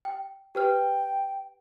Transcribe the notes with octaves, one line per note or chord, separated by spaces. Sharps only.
G5
G4 B4 G5 F6